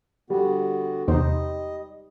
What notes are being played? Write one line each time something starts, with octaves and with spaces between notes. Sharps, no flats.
D3 G3 B3 F#4
E2 C3 D#4 C5 D#5